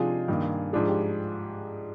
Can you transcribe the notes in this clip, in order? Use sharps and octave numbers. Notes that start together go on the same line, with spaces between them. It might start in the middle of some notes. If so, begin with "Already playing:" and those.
Already playing: C3 F3 G#3 D4 D#4 F4 G#4
G2 D#3 A#3
G#2 F3 G#3 D4 F4 G#4
G4